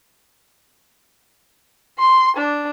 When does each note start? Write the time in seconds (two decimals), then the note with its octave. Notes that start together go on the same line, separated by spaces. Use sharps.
1.99 C6
2.37 D4